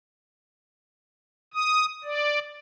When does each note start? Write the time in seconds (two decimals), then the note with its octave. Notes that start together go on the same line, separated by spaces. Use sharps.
1.53 D#6
2.04 D5